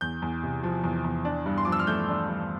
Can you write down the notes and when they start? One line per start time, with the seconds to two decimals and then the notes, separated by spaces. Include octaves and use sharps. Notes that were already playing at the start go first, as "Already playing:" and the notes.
0.01 E2 G6
0.22 E2
0.43 C3
0.63 F3
0.84 E2
1.04 E2
1.25 D4
1.46 G2
1.58 C6
1.65 F3 D6
1.72 E6
1.79 F6
1.87 A3 G6
2.09 D4
2.28 G2